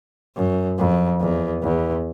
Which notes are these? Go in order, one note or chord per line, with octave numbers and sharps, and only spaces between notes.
F#2
F2
E2
E2